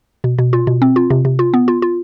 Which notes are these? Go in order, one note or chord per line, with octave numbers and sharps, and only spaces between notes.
B2
B2
F4
B2
C4
F4
C3
C3
F4
B3
F4
F4